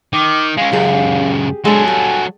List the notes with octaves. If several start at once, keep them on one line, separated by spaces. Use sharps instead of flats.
D#3 D6
G#3 C#4 F5
C#2 F#2 G4 G#4
F#3 G#3 D4 A4 G#5
G3